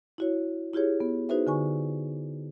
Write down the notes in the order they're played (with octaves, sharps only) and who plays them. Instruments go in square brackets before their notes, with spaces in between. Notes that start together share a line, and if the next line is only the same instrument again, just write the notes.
[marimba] E4 F#4 C#5
E4 F4 G4 G#4 C#5
B3
D#4 F#4 G#4 B4 C5 E5
D3 G#5 C#6